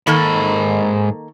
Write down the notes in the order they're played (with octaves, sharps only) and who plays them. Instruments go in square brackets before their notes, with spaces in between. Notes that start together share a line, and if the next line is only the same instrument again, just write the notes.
[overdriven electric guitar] G#2 B5 [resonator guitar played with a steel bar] D#3 A#3 A4